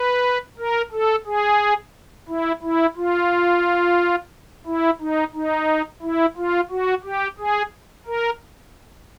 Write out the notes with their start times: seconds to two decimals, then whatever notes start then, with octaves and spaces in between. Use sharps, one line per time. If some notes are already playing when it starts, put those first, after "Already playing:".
Already playing: B4
0.58 A#4
0.92 A4
1.26 G#4
2.28 E4
2.62 E4
2.96 F4
4.67 E4
5.00 D#4
5.34 D#4
6.02 E4
6.37 F4
6.70 F#4
7.04 G4
7.39 G#4
8.07 A#4